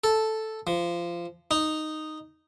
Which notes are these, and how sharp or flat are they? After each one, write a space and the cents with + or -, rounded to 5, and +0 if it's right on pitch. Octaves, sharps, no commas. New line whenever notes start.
A4 -5
F3 -20
D#4 -5